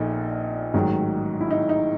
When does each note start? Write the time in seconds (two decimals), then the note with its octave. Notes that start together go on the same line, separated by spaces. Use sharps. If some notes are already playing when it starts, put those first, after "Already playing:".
Already playing: A#1 A#2 F3 D#4 A4
0.74 A1 G#2 D#3 F#3
1.41 E4
1.51 D#4
1.69 D#4